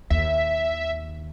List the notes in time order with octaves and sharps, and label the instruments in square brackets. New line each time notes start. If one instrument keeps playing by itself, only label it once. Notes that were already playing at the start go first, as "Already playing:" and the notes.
[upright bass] D#2 [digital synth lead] E5